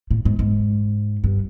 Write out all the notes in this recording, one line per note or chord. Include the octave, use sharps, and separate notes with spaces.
A2
G#2
G#2
G2